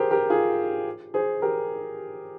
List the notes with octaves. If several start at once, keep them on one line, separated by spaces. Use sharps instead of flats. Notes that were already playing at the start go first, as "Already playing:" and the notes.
Already playing: G4 G#4 A#4 C5
G4 A#4
F4 G#4
G#4 C5
G4 A#4